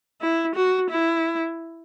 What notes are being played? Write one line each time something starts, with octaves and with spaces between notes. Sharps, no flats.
E4
F#4
E4